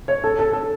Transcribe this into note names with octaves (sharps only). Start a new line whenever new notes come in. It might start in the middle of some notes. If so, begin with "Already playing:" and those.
C#5
A4
A4
A4